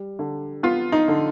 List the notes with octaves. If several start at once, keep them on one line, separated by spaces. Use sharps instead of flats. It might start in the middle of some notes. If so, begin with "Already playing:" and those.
Already playing: G3
D3
B3 F4
D#4
D3